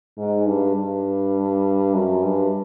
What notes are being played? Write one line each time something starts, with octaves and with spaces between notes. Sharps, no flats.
G#2
G2
G2
F#2
G2